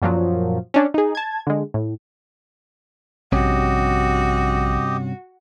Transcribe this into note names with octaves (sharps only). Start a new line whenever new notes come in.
F#2 A#2 F3 F#3
C#4 D4 D5
D#4 G#4
A5 G#6
D3 G#3
A2
A#1 G2 C3 C#4 F#4 G4 D#5